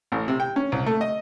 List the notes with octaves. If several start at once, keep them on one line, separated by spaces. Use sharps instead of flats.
A1
C3
G5
C#4
C2
A3
D#5